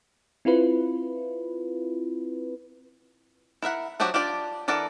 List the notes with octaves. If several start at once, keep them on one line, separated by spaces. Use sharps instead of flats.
C4 E4 F4 B4
E4 A#4 E5 F#5
F3 F#3 D4 F#4 G4
D4 F4 G4 D5
E3 D4 A4 A#4 F#5